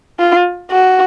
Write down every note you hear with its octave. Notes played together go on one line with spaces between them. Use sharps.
F4
F#4